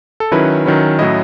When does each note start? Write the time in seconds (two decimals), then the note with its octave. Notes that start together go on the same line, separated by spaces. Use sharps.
0.20 A4
0.32 D#3 F#3 C#4 E4 B4
0.65 D#3 F#3 C#4 E4
0.99 A2 F#3 C#4 E4 D#5